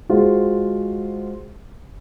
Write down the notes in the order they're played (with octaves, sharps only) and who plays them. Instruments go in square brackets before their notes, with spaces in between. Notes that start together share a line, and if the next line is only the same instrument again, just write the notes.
[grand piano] G#3 F4 F#4 C5